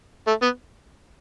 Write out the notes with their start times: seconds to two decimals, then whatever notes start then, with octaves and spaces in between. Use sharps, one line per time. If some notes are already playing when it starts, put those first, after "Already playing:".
0.27 A3
0.42 B3